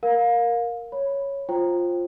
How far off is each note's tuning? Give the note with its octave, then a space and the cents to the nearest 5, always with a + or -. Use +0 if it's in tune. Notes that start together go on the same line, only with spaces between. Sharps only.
A#4 +0 F5 +25
C#5 +0 B5 +0
F4 +5 C5 +20 G5 +0